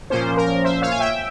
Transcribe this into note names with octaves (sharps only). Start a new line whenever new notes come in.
A#2 F3 A#3 C#4 C5
A#4
C5 E5
C#5 F5
G#5
E5 G5